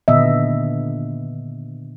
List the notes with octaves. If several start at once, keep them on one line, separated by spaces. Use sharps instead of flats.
A#2 D3 D#3 B3 D#5 E5